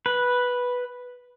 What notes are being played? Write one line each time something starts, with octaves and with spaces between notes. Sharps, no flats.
B4